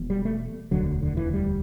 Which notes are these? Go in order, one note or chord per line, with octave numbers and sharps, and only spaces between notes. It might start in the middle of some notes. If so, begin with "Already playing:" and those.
Already playing: E1 E2 B2
G3
A3
E1 D2 D3 F#3
D3
E3
G3